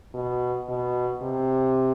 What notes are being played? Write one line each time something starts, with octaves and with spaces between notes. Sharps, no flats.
B2
B2
C3